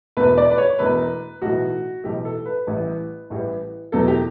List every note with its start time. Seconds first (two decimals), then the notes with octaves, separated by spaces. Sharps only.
0.17 E1 E2 B2 A3 B4
0.38 D5
0.50 B4
0.58 C#5
0.79 E1 E2 B2 A3 B4
1.42 B1 A2 E3 A3 F#4
2.04 B1 A2 E3 A3 G4
2.25 A4
2.46 B4
2.67 A1 A2 E3 G3
3.30 A1 A2 E3 G3
3.92 E1 E2 B2 F#3 A3 A4
4.08 G4